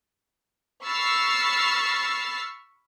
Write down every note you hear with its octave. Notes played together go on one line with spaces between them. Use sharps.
B5 C#6 E6 F6 A6 C7